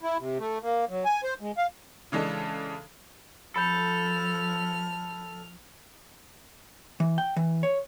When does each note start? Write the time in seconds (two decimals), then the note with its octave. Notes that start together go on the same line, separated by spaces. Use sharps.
0.03 E4
0.19 C3
0.39 A3
0.62 A#3
0.89 F#3
1.05 G#5
1.24 C5
1.41 G#3
1.57 F5
2.12 C#3 E3 G#3 D4 A4
3.56 F3 A4 B5 F6 G6
7.00 E3
7.18 G5
7.36 E3
7.63 C#5